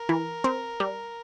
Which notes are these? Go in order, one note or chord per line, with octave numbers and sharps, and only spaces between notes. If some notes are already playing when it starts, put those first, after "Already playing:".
Already playing: A#4
E3
C4
G3